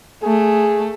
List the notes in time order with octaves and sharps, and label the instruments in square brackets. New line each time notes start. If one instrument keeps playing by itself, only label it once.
[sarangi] A3 [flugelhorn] G#4